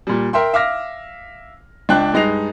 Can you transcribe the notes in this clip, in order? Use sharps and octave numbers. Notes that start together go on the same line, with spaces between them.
A#2 G3
A#4 E5 G5 C6
E5 F5 D6 F6 A#6
C#2 D4 G5 F#6
G2 G#3 D#4 A#6 C7 F7